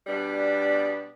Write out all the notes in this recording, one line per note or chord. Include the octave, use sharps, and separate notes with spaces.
B2 G3 B3 D4 D5